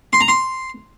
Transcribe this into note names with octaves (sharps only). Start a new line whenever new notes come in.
C6
A#5
C6